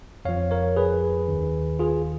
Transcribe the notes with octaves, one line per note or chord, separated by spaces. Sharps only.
F2 F3 C#5 F5
A#4 C#5
G#4 B4
D#2 D#3
F4 G#4